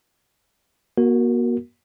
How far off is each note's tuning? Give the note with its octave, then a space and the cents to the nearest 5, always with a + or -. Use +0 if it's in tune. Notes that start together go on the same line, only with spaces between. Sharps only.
A#3 +45 F#4 +0 A#4 +0